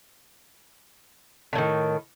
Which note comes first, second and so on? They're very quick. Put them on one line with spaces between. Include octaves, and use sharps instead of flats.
D3 A2 D#3